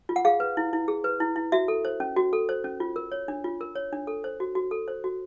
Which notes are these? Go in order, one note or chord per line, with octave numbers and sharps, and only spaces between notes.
F4
F#5
G#4 F5
B4
E4
E4
G#4
B4
E4
E4
F#4 E5
A4
C5
C#4
F#4
A4
C5
C#4
F4
A#4
C#5
D4
F4
A#4
C#5
D4
A4
C5
F#4
F#4
A4
C5
F#4